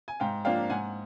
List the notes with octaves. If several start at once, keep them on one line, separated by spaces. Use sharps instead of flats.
G#5
G#2 F5 G5
F3 A#3 D4 F5 G5
G#2 F#5 G#5